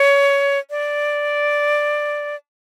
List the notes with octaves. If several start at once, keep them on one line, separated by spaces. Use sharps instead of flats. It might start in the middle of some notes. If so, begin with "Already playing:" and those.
Already playing: C#5
D5